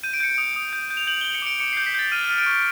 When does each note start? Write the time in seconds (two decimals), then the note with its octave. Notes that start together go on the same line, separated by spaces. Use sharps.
0.03 G6 D#7
0.14 D7
0.20 G6 C#7
0.34 D#6 D7
0.56 D#6
0.73 G6
0.90 G6
0.97 F7
1.07 G6 F#7
1.21 G6 G7
1.34 C#7
1.42 D6 D7
1.60 D6 C#7
1.73 C7
1.77 G6
1.86 B6
1.94 G6 A6
2.12 F6 D#7
2.25 D#7
2.29 F6
2.38 D7
2.46 C#6
2.51 D7